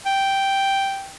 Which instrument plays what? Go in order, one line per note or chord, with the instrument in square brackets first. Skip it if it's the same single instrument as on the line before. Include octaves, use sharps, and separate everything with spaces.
[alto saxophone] G5